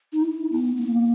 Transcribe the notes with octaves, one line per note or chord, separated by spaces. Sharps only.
D#4
E4
B3
B3
A#3